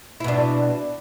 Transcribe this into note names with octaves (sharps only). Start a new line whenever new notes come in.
B2 D4 E4